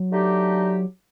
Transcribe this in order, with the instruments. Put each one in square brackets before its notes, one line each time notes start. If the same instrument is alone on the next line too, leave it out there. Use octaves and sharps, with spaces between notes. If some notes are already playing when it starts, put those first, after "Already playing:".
Already playing: [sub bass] F#3
[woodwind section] D3 A3 D#4 G4